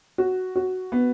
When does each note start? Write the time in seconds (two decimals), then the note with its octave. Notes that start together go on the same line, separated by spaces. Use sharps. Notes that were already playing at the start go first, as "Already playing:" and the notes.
0.18 F#4
0.56 F#4
0.92 B3